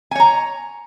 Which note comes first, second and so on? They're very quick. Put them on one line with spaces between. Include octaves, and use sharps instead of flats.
G#5 C#5 A#5